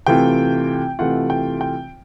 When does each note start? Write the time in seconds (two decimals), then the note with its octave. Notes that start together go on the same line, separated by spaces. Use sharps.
0.06 C3 E3 A3 C4 F4 G5
0.99 C3 E3 A3 C4 F4 F#5
1.30 G5
1.61 G5